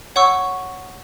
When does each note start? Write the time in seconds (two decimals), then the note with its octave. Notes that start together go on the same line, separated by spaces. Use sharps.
0.16 C#5 F#5 C#6 E6